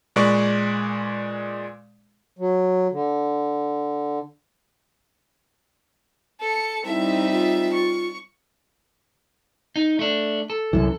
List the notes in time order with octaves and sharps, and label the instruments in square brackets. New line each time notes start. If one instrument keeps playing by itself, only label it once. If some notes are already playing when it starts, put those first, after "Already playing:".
[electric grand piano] A#2 G#3 B4 D5 C#6
[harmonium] F#3
D3
[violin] A4 C#7
[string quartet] G3 C4 D#4 [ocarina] E4 [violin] E5
[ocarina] F4
[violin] C#6
[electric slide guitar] D#4
A3 D4
A4
[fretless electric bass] C2 F#2 E3